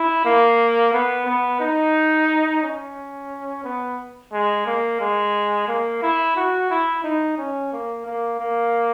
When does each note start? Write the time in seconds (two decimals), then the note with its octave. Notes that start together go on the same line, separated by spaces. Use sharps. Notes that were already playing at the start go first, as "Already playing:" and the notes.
Already playing: E4
0.25 A#3
0.93 B3
1.26 B3
1.60 D#4
2.63 C#4
3.64 B3
4.33 G#3
4.66 A#3
5.00 G#3
5.68 A#3
6.03 E4
6.36 F#4
6.70 E4
7.04 D#4
7.38 C#4
7.73 A#3
8.06 A#3
8.40 A#3